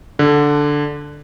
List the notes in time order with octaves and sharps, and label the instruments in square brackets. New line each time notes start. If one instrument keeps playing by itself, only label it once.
[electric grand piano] D3